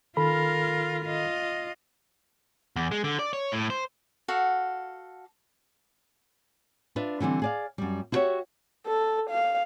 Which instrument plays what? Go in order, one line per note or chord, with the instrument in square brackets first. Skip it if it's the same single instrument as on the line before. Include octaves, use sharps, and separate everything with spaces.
[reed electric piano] D#3 A4 B5 [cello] F4 A#4
[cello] F4 D#5
[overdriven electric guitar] E2
G#3
D3
D5
C#5
A2
C5
[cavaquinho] F#4 A4 F5 F#5
[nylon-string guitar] D4 F4 B4 D5 E5
D3 E3 G3 C4
G#4 D5 F5
F#2 G3
E4 F#4 G4 A#4 C#5 E5
[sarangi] A4
F5